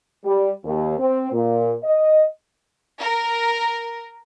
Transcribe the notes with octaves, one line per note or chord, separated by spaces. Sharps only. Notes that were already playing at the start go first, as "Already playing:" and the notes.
G3
D#2
C4
A#2
D#5
A#4